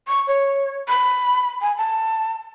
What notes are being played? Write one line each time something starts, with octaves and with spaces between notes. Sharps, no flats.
C#6
C#5
B5
G#5
A5